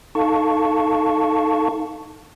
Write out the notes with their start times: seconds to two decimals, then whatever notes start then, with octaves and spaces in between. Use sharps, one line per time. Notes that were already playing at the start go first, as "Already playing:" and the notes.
0.15 D#4 A4 F5 A5 C#6